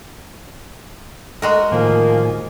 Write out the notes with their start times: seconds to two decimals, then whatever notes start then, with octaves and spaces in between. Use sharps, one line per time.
1.42 G#3 F#4 A4 A#4 D#5
1.72 A2 D#3 F3 A#3 G#5